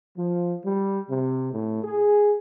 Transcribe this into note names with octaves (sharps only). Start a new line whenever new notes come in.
F3
G3
C3
A2
G#4